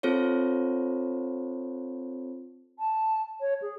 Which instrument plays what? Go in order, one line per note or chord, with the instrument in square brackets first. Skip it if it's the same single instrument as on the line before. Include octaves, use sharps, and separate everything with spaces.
[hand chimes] C4 F4 A4 C5 C#5
[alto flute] A5
C#5
G#4